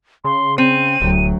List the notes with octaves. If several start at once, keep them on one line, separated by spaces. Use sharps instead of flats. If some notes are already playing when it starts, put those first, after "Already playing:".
C#3 C6
C4 D#7
D1 D2 F#3